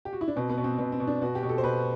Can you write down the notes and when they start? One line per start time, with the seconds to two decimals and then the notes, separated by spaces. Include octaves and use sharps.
0.05 G4
0.13 F#4
0.21 E4
0.28 D4
0.36 B2 C4
0.50 B3
0.58 B2
0.64 C4
0.78 B2 C4
0.92 C4
1.00 B2
1.07 D4
1.22 B2 F#4
1.35 G4
1.43 B2
1.49 A4
1.58 C5
1.64 B2 B4